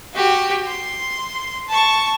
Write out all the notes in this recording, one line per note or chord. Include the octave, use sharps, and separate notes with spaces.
F#4 G4
C6
A5 C#6